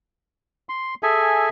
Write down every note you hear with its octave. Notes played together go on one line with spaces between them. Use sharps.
C6
G#4 A4 E5 G#5